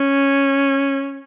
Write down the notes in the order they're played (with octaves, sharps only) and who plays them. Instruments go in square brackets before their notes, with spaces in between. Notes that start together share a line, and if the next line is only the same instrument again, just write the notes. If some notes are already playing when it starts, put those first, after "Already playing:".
Already playing: [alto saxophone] C#4